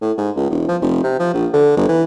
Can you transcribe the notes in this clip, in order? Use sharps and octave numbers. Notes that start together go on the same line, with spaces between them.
A2
G#2
C#2
E1
F3
F1
C3
F3
A#1
D3
G1
E3